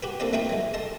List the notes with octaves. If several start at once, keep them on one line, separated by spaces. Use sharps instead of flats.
F#4 G4 B4
A#3 C4 D4 A4 B4 C5
A3 D#4 F4 B4 F5 G5
F#3 G#3
A4 D#5 A5 C6